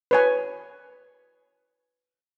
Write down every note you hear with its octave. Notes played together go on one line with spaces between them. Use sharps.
B4 C#5 G#5